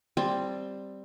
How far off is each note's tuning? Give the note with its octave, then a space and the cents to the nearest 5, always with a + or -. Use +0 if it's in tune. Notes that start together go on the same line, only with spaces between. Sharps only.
G3 +0 C4 +0 A5 +0